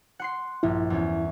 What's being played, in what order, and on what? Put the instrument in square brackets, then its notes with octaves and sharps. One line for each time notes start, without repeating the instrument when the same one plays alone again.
[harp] F#5 C6 C7
[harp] A#1 G2 [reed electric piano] E4
[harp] E2 C#4